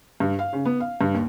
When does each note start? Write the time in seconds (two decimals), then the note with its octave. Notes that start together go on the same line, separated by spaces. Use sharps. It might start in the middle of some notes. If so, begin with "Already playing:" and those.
0.20 G2
0.39 F5
0.53 C#3
0.65 B3
0.80 F5
1.01 G2
1.14 D#2